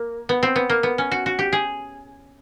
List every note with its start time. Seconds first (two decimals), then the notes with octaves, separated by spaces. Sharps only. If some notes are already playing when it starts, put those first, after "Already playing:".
Already playing: A#3
0.29 B3
0.43 C4
0.56 B3
0.70 A#3
0.83 B3
0.98 C#4
1.12 F#4
1.26 F#4
1.39 G4
1.53 G#4